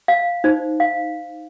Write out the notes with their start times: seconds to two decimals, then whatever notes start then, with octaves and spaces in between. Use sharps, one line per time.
0.08 F5
0.44 D#4 C5
0.80 F5